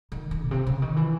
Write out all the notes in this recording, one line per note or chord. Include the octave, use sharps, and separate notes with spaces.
D#3
D#3
A2
C3
C#3
D#3
E3